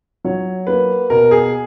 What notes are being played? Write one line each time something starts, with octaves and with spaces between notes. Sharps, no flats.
F#3 C#5
A#3 B4
B2 A#4
G#4